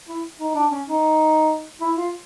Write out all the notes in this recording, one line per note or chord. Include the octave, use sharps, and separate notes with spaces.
E4
D#4
D4
C#4
D#4
E4
F4